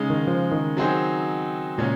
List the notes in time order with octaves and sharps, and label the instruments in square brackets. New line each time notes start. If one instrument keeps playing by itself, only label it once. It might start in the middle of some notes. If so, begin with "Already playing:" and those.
Already playing: [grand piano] C#3 G#3 D#4
[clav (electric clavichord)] D#3
F3
D#3
[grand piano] F#3 C4 D#4 G#4 C5
[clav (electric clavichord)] A#2 [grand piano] C#3 G#3 C#4